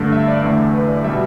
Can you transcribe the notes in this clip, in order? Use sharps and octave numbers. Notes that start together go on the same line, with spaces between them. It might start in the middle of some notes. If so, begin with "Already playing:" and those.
Already playing: G2 D3 A3 A4
E5
D5
E2 D3 A3 E5
B4
D5
B2 G3 E5